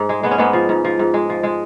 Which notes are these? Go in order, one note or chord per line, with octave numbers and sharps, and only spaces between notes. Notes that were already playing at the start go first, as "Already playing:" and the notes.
Already playing: G#2
G#3
G#3 B3
C#4
G#2 G#3 B3
F3
G#2
F3
G#2
G#3
F3
G#3